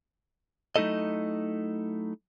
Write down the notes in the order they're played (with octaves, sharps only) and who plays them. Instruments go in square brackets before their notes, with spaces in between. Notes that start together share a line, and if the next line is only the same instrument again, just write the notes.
[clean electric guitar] F#3 A3 D#4 E4 A4 D#5